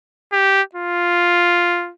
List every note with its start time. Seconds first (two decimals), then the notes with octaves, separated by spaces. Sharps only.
0.33 G4
0.75 F4